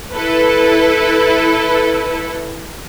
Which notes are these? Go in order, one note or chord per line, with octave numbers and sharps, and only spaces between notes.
E4 A4 B4